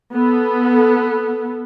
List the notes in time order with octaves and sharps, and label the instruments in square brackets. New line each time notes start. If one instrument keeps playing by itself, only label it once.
[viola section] B3 A4